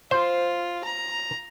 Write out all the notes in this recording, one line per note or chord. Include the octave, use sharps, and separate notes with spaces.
F4 C5
A#5